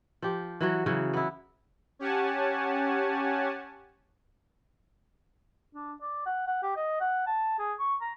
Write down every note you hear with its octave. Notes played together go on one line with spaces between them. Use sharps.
F3 G4
E3 F#3 F#4
C#3 E3 F#3
B3 E4
C#4 G4 C#5 F#5 G#5 A5
D4
D5
F#5
F#5
G4
D#5
F#5
A5
G#4
C#6
A#5